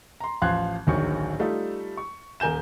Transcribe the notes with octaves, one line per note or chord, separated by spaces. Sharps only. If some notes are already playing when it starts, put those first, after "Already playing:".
A#5 C6
A1 F3 F5 C6 F#6 G#6
D1 A#1 D#3 F#3 C#6
G3 A3 D#4 F4
C#6
D#1 A#4 G#5 G6 E7